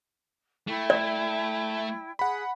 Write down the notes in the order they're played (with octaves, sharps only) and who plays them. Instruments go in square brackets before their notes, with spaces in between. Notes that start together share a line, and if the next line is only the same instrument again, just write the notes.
[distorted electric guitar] A3 [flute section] E4 G5
[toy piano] D5
[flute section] G#4 [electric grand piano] F#5 B5